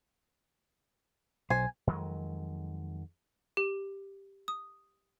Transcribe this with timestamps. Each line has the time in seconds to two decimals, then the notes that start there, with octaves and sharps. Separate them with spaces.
1.50 B1 C5 G#5
1.87 F2 D#3 F#3 G#3
3.57 G4
4.48 D#6